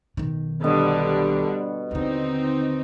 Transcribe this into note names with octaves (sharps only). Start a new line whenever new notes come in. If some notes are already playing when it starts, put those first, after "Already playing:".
B1 D#3
B2 D3 G3
D#2 D3 C4 D#4